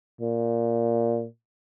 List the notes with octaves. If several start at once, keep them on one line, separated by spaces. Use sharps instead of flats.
A#2